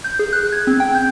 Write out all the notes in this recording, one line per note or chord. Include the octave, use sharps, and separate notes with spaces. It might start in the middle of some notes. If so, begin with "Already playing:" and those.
G6
G#4
F#6
G#6
C4
G5
G6